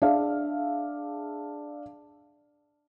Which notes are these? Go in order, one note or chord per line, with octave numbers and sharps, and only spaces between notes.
D4 G#4 E5 F5